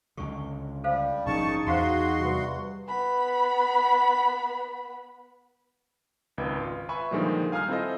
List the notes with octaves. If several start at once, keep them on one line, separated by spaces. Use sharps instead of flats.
C#2 D3 C#6
G3 A4 C5 F5
A#1 G#2 D#3 C#4 D#4 G#4 A5 C#6
E2 F#4 C5 F5 A#5 C6
G2 C3 G3
B3 B5
G#1 C#2 B4 G5 G#6
F4
B4 E5 G#5 B5 C#6
A#2 D3 D#3 F3 G3 G#3
F5 G#5 A#5 D#6 F6 G6
C4 E4 F4 A4 C5 D#5